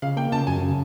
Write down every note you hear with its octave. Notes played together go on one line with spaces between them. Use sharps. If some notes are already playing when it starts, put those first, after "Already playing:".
C#3 F5
A#3 G5
C#3 A5
F#2 G#5
C#3